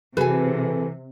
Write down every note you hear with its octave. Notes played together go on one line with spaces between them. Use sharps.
C3 E3 F#4 G#4 A4 B4 G#5